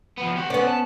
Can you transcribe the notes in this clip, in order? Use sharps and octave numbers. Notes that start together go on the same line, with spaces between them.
F3 B3
G4 F#5
C2 B3 C#4 D5
A5